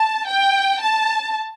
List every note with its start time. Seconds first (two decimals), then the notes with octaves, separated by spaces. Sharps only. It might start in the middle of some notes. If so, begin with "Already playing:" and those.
Already playing: A5
0.27 G5
0.80 A5